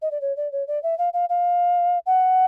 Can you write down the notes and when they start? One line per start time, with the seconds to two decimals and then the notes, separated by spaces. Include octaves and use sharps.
0.02 D#5
0.11 D5
0.21 C#5
0.37 D5
0.52 C#5
0.67 D5
0.83 E5
0.98 F5
1.13 F5
1.29 F5
2.06 F#5